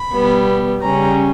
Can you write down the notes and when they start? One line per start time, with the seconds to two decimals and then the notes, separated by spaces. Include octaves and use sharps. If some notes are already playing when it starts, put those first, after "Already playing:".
Already playing: B5
0.12 B2 G3 B3
0.82 C#3 G3 C#4 A#5